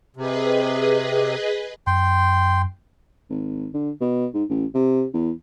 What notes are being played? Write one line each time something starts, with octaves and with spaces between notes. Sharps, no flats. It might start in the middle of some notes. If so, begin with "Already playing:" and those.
C3 G#4 B4 D#5
F#2 G5 C6
G#1
D3
B2
G#2
A1
C3
E2